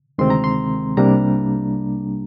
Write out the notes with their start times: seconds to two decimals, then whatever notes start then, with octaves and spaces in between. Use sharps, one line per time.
0.18 D2 C3 D#3 G#3 C4 C6
0.30 A#5
0.44 C6
0.97 C2 C3 G3 A#3 D4 A#5